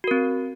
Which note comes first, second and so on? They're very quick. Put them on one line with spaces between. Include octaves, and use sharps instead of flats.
F#4 A#4 C4